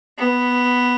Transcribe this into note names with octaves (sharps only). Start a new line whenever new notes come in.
B3